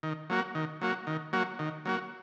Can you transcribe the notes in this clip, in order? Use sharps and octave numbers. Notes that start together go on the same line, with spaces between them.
D#3
F#3 A#3 F#4
D#3
F#3 A#3 F#4
D#3
F#3 A#3 F#4
D#3
F#3 A#3 F#4